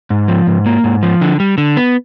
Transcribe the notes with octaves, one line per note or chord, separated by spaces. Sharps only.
G#2
F3
G#2
A#3
G#2
F3
D3
G3
D3
B3